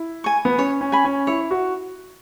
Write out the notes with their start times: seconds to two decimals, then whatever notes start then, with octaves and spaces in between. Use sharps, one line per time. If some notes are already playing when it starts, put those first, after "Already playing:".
Already playing: E4
0.24 G#5 C#6
0.45 B3
0.58 C#4 C#5
0.81 C#4
0.92 G#5 B5
1.05 C#4
1.27 E4 C#5
1.51 F#4